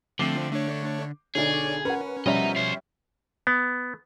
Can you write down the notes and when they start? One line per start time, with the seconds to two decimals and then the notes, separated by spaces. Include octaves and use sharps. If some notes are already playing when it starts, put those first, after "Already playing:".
0.19 D3 F3 A3 C4 D6 C7 G7
0.51 A3 D4 C#5
1.35 B1 D3 G#4 C#5 D5
1.85 C#4 A#4 B4 F#5
2.26 B2 F3 G3 C#4 D#5 E5 A#5
2.56 C#5 C6
3.47 B3